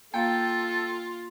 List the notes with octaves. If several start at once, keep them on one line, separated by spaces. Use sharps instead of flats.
A#3 F4 A4 F5 G5